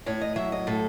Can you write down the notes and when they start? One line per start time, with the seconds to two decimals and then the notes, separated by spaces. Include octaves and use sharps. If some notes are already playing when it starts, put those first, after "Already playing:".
0.06 A2 C#5
0.21 D#5
0.36 F#3 E5
0.52 D#5
0.67 A2 A4